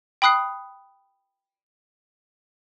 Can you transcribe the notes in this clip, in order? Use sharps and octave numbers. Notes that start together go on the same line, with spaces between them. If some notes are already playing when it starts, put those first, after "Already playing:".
G5 B5 D#6 F#6 C7